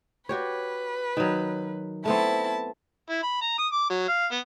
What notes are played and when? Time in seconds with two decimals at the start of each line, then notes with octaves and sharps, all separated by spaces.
0.29 F#4 G4 B4 C#5
1.17 D#3 F#3
2.05 A3 B3 C4 E4 A5
3.10 E4
3.23 B5
3.41 A#5
3.58 D#6
3.72 D6
3.90 F#3
4.08 F5
4.31 B3